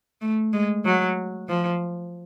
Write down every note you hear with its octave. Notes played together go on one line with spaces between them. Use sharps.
A3
G#3
F#3
F3